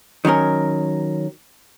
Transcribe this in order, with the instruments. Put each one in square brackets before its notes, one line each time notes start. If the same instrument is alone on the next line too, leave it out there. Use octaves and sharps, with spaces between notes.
[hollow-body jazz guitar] D#3 F#3 C#4 A#4